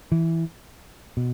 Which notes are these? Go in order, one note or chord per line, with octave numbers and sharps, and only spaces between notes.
E3
B2